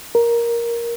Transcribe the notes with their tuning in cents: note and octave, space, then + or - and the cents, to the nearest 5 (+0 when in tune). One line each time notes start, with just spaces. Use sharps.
A#4 +10